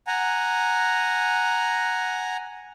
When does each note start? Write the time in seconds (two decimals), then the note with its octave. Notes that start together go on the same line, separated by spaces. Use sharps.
0.07 F#5 G#5 A#5